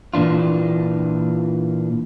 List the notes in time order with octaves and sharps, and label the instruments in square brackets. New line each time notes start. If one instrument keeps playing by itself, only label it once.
[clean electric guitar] A#2 E3 D4 F4